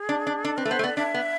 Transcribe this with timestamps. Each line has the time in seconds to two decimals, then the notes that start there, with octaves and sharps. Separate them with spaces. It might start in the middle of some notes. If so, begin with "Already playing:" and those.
Already playing: G#4
0.09 D4
0.27 D4
0.44 D4 A4
0.57 C4 B4
0.65 A3
0.70 B3 C5
0.79 A3
0.84 B3 D5
0.97 D4 E5
1.14 B3